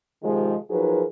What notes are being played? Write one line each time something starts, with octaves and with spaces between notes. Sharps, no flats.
C3 D#3 F3 G#3
F3 F#3 D#4 G#4 A#4 B4